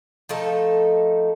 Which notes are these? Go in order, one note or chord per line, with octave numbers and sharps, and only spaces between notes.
F3 A3 D#4 A4